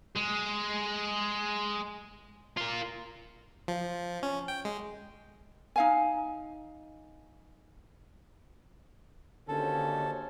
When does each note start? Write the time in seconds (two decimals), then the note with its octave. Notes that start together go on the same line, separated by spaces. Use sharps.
0.16 G#3
2.57 F4 A#4
3.68 F3
4.23 C#4
4.48 G5
4.65 G#3
5.76 D#4 F5 G#5
9.48 G#1 D#2 D3 C#4 A4 C5